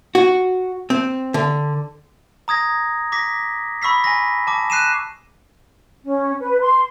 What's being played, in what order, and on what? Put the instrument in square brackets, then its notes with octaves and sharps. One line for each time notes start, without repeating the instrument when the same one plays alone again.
[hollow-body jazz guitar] F#4
C4
D3
[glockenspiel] A#5 D#6 G#6 A#6
D6 A#6 B6
B5 C#6 E6 B6 C7
G#5 A#6
A5 D6
F#6 C7 D#7 E7
[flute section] C#4
B4
C6